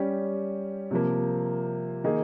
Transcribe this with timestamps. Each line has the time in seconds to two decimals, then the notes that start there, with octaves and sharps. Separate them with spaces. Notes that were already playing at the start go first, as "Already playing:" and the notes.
Already playing: G3 C#4 G4
0.91 C3 F3 A#3
2.04 D#3 A#3 D#4 G#4